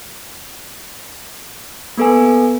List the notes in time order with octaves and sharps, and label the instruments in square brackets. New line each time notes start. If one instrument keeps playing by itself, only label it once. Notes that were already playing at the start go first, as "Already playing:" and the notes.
[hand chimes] A#3 B3 A4 B4 G#5